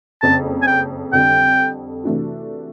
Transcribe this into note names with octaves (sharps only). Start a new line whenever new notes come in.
F#1 F2 C#3 A5
G#5
G5
F2 D3 G3 G5
C3 E3 A3 D4 F#4